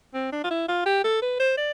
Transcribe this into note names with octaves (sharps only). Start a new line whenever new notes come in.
C4
D4
F4
E4
F4
G4
A4
B4
C5
D5